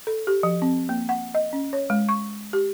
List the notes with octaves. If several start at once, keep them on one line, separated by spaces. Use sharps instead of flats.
A4
G4
F3
C4
A#3
F#5
D#5
C#4
C#5
G#3
C#6
G4